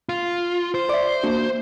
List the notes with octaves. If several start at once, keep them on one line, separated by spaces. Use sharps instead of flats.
F4
C5
D5 E5
A#3 D4 F#4